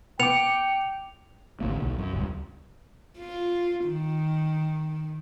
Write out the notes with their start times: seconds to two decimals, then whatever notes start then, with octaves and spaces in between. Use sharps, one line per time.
0.20 B3 G5 D6 C#7 F7
1.61 G#1 D2 A#3
1.81 B1
1.99 F#2
2.13 D#1 C#2 G2
3.19 F4
3.86 D#3